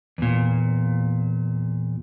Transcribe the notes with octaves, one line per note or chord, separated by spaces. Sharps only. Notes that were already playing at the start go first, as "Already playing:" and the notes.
E2 A#2